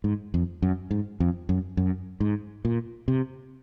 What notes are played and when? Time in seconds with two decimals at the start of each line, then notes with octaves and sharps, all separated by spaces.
0.04 G#2
0.34 F2
0.62 F#2
0.91 G#2
1.20 F2
1.49 F#2
1.77 F#2
2.20 G#2
2.65 A#2
3.08 C3